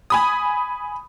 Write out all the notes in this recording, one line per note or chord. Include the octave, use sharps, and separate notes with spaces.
G#5 B5 D#6